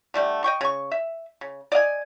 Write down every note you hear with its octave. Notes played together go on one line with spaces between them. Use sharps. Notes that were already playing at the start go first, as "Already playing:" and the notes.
D3 G3 A3
D#5 G5 C#6
C#3 C#6
E5
C#3
D5 D#5 F5 G#5